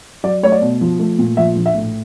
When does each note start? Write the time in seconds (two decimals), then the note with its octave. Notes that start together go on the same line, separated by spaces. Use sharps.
0.24 F#3 D5
0.43 A3 C#5
0.52 D5
0.61 B2
0.81 F3
0.99 A3
1.19 A#2
1.37 F3 E5
1.56 A#1
1.66 E5
1.75 A2